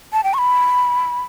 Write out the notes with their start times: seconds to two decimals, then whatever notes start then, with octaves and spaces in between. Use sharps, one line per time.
0.13 A5
0.24 G5
0.34 C#6
0.38 B5